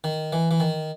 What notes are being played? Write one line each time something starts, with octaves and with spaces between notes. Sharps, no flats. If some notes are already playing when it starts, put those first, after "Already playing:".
D#3
E3
E3
D#3